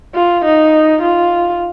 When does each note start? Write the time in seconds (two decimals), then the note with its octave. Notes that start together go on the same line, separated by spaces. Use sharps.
0.15 F4
0.45 D#4
1.02 F4